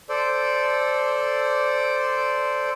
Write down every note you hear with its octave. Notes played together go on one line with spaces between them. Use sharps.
A4 C5 D5